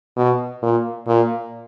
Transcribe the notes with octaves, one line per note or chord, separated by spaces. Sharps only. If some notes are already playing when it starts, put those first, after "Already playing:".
B2
A#2
A#2